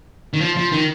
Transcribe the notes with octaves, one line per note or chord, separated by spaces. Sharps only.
D#3
F3
F3
D#3